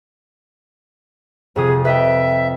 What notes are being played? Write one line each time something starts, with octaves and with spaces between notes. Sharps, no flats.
F2 C3 G#4 D#6
B4 D#5 E5 G5